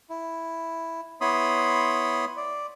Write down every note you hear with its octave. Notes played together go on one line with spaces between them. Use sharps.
E4
B3 E4 C#5 B5 C6 D#6
D5